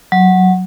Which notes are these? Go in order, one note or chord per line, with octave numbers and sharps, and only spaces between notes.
F#3